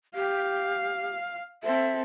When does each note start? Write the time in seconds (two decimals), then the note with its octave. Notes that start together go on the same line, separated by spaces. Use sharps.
0.15 G4 F5
1.64 C4 A4 E5